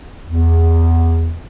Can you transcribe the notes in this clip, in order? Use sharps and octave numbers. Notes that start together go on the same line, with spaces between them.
E2